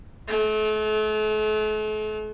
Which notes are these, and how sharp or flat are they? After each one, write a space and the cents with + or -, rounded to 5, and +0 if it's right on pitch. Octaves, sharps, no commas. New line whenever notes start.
A3 -40